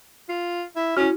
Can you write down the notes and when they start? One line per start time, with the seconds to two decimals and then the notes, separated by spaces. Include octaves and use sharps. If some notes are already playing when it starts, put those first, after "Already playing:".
0.29 F4
0.76 E4
0.97 C#4 E4 F#4